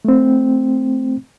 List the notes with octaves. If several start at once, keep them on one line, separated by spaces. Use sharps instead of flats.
A3 C4